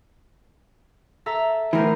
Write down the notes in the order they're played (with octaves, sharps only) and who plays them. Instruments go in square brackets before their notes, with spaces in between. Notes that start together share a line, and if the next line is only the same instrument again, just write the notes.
[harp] A4 E5 A#5
[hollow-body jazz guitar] A2 E3 [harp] B3 A#4 C5